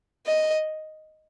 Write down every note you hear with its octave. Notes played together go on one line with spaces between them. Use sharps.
D#5